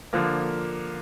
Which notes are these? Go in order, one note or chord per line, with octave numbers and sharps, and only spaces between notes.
D3 F3 A#3